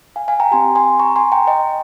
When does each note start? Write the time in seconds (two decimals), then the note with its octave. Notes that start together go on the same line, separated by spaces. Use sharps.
0.16 F5 G#5
0.28 F5 G#5
0.40 G5 A#5
0.52 C4 G4 G#5 C6
0.76 G#5 C6
0.99 A#5 C#6
1.16 G#5 C6
1.32 G5 A#5
1.47 D#5 G5